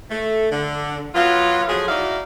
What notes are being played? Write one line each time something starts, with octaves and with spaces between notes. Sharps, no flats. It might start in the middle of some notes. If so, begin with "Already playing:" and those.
A3
D3
F#3 B3 F4
F3 F#3 A3 G#4
D#4 E4 F#4 D5 F5